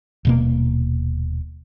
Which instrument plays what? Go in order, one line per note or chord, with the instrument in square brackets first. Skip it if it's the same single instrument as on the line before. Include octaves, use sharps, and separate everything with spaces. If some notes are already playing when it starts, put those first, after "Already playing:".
[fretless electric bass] D#1 B2 A#3